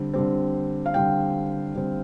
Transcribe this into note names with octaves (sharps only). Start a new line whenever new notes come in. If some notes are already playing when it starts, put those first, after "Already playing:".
Already playing: D3 G3 C4
D3 G3 C4
F5
D3 G3 C4 G5
D3 G3 C4